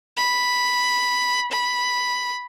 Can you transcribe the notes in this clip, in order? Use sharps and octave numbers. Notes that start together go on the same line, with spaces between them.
B5
B5